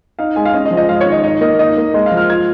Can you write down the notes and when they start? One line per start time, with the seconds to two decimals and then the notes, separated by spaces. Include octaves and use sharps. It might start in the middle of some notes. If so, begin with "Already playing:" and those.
0.19 D#4 F5
0.36 G#3 G#5
0.46 F5
0.54 C#4 D#5
0.66 D#5
0.71 F3
0.77 D#5
0.89 G#3 F5
1.01 C#5
1.06 D#3
1.12 D#5
1.24 D#4 D#5
1.41 A#3 D#5
1.59 D#4 D#5
1.77 A#3
1.94 G#3 D#5
2.06 F5
2.12 F3
2.17 F6
2.29 F4 G#6